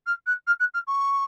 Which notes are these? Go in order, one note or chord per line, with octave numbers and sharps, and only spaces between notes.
F6
F#6
F6
F#6
F6
C#6